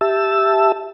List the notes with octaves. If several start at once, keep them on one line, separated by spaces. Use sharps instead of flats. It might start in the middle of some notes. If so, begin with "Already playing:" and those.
G4 E5 A5 E6